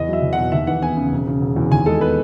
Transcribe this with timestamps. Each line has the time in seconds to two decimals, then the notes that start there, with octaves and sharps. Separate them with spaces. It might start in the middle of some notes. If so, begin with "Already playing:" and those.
Already playing: E2 D#5
0.08 F#3 E5
0.22 E2
0.33 B2 F#5
0.52 D#2 E5
0.67 E3 F#5
0.82 B3 G#5
0.97 C#3
1.12 E1
1.27 C#3
1.41 E1
1.56 E2
1.71 D#2 G#5
1.86 G#3 A4
2.01 B3 B4